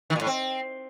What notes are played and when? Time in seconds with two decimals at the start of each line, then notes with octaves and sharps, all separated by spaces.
0.10 D#3
0.16 A#2
0.21 A2
0.27 C4